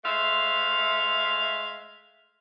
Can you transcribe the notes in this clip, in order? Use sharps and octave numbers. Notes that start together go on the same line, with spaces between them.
G#3 A3 C5 E5 F5